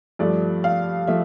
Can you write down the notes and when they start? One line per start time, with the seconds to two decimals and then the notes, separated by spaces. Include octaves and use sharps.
0.19 G2 F3 A3 D5
0.64 F5
1.07 F3 A3 E5